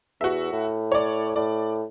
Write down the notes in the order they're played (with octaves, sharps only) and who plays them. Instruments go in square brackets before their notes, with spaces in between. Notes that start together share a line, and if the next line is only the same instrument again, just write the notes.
[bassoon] E2 [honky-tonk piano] F#4 E5
[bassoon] A2
[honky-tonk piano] C#5 D5
[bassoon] A2 [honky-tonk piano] D5